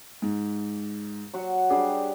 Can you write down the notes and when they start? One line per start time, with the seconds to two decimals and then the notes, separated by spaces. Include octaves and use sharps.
0.22 G#2
1.34 F#3 F#4
1.70 G3 D4 G4 G#4